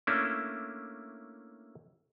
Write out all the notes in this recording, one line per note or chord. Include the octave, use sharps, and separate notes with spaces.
A3 A#3 C#4 D4 E4